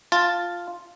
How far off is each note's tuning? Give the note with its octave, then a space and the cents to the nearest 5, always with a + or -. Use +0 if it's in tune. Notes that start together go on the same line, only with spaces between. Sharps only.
F4 +0 A5 +0